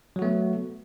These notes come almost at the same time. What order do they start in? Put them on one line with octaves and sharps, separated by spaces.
F#3 F#4 A3 B3